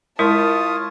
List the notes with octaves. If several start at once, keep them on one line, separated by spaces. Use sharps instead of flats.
G#3 E4 F4 A#4 C#5 A5 D#6